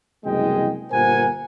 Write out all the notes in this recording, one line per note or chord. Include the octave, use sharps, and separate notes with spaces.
F#1 C2 E3 G#3 D#5 G5
G1 A#2 A#4 C5 F#5 G#5